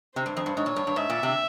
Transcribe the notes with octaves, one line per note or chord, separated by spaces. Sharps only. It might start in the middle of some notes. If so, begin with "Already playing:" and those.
C3 C5
G2
F2
G2
G#2 C#5
A#2
G2
G2
G#2 E5
A#2
C3